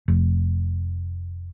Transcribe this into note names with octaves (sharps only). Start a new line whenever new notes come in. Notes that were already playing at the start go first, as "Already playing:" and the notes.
F1